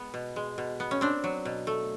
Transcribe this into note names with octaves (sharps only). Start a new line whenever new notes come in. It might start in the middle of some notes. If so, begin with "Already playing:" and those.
Already playing: G#3 B3
B2
G#3
B2
B3
C#4
C4 D4
F#3
B2
A3